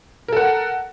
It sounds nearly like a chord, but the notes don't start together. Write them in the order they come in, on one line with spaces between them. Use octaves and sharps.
A#4 A4 F#5